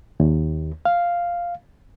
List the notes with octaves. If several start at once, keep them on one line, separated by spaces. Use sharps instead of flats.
D#2
F5